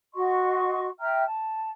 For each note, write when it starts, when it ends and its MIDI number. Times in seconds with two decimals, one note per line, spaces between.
0.14 0.89 66
0.14 0.89 75
0.14 0.89 84
0.14 0.89 85
0.99 1.24 76
0.99 1.24 79
0.99 1.24 82
0.99 1.24 89
1.27 1.70 81